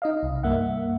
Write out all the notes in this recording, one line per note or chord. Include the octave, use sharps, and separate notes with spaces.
D#4 D#5 F5
C2
G2 A#3 E5 F#5